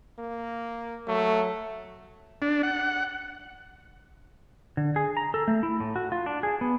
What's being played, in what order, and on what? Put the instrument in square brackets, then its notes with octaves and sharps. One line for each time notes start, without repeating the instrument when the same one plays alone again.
[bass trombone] A#3
[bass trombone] F#3 [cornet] A3
[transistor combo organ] D4
F#5
[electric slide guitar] D3
G#4
A#5
A4
A3
E4
A2
F#4
F4
D4
G#4
B3